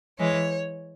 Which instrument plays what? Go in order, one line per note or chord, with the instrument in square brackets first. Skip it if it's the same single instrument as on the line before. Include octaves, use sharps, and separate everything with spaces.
[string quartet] E3 G#3 [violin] C#5